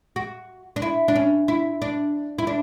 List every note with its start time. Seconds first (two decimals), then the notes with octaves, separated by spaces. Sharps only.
0.16 F#4
0.76 D4
0.82 E4
1.08 D4
1.16 C#4
1.48 E4
1.82 D4
2.38 E4
2.47 D4